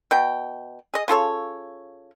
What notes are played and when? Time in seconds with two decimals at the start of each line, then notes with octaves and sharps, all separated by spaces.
0.11 B2 G5
0.94 G#4 D#5
1.08 C#3 F4 A4 C#5